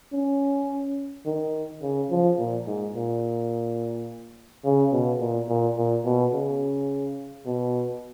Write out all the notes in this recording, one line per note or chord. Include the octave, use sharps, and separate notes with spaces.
C#4
D#3
C#3
F3
A#2
G#2
A#2
C#3
B2
A#2
A#2
A#2
B2
C#3
B2